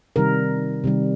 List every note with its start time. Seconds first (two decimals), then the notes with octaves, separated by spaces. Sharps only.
0.16 C3 D#3 G3 A#4
0.84 C3 D#3 G3